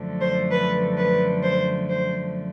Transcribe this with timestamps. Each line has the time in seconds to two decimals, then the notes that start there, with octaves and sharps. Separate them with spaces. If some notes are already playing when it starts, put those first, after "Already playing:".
Already playing: F#2 D3 F3 A3
0.21 C5
0.51 B4
0.98 B4
1.43 C5
1.89 C5